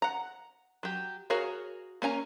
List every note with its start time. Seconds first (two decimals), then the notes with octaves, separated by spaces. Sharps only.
0.02 F#5 A#5
0.83 F#3 G4
1.30 F#4 G#4 A#4 C#5 F5
2.02 A#3 C#4 G#5 A#5